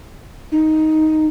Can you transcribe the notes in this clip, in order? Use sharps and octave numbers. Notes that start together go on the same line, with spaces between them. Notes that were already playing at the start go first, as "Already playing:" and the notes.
D#4